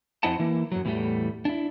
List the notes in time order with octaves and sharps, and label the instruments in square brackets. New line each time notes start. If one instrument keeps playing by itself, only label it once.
[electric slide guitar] F2 C4 E4 D#5 F#5 A5
E3 A#3 E4
F#2 F#3
E2 A2 E3 G3 A3
D4 E4